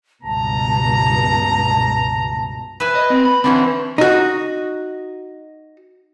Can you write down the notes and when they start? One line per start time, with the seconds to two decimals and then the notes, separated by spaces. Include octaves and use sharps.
0.23 C#2 G2 B2 A5 A#5
2.80 B4 E5 G#5
2.95 D#5
3.10 C4
3.25 B5
3.44 D3 E3 C4 C#4
3.98 D#4 F#4